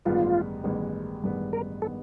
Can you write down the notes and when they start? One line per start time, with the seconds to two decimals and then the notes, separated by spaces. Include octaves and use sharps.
0.05 A1 G2 D#3 G#3 B3 F4
0.64 A1 G2 D#3 G#3 B3
1.24 A1 G2 D#3 G#3 B3
1.53 A#4
1.82 D#3 G#3 B3 A4